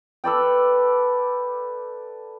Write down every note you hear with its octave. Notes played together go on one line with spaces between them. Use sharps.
A4 B4 D5 G5